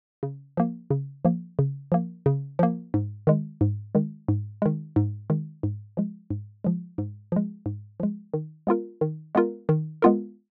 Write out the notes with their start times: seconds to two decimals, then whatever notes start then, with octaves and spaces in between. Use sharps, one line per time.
0.23 C#3
0.57 F3 A#3
0.91 C#3
1.25 F3 A#3
1.59 C#3
1.92 F3 A#3
2.26 C#3
2.59 F3 A#3
2.94 G#2
3.27 D#3 G#3
3.61 G#2
3.95 D#3 G#3
4.28 G#2
4.62 D#3 G#3
4.96 G#2
5.30 D#3 G#3
5.63 G#2
5.97 F3 G#3
6.30 G#2
6.64 F3 G#3
6.98 G#2
7.32 F3 G#3
7.66 G#2
8.00 F3 G#3
8.34 D#3
8.67 G#3 B3 F4 A#4
9.01 D#3
9.35 G#3 B3 F4 A#4
9.69 D#3
10.02 G#3 B3 F4 A#4